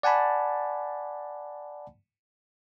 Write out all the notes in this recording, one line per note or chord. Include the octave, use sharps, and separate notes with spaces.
D5 F#5 G#5 A5 B5